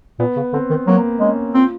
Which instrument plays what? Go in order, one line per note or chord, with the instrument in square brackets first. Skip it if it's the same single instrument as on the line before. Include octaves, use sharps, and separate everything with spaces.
[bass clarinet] A#2 [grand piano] B3
[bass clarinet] C#3
[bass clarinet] D3 [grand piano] C4
[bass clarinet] D#3
[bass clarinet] F#3 [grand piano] A#3
[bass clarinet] G#3 [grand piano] C#4
[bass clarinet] C4 [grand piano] F4